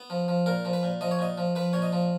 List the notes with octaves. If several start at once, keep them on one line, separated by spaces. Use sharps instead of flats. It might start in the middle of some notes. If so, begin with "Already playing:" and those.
Already playing: B3
F3
F3
A#2 A#4
F3
B4
A#2
F3 D#5
C#5
A#2 D#5
F3
F3 B4
A#2 C#5
D#5
F3